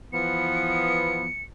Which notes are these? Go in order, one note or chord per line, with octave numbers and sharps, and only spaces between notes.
E3 F3 B3 C#7